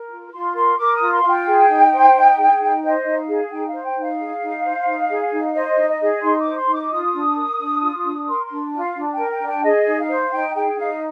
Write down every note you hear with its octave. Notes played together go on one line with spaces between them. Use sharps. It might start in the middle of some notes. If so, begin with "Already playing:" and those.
Already playing: A#4
F4
F4 C6
A#4 C6
A#4 D6
D#6
F4
C6
F4 F5
G5
G#4
D#4
C5
D#4
G#4
D#4
C5 D#5
D#4
F5
G#4
D#4 G5
F5
C5
G5
D#4
F5
G#4
D#4
C5
D#4
G#4
D#4
C5 D#5
D#4
D#5
G#4
D#4 C6
D6
C5
C6
D#4
D6
F4 D#6
D4
A#4
D4
F4
D4
A#4 C6
C6
D4
F4
F5
D4
G5
A#4
G5
D4
G5
G#4 D#5
D#4
F5
C5
D#4 G5
G#4 G5
D#4 F5